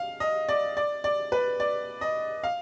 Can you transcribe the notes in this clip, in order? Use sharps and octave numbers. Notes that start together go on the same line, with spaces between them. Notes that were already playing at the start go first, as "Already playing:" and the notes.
Already playing: F5
D#5
D5
D5
D5
B4
D5
D#5
F5